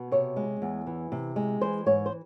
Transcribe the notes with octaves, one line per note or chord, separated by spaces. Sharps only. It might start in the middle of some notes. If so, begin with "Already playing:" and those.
Already playing: B2
C3 C#5
G#3
E2
E3
C3
G#3
E3 C5
G#2 C#5
C5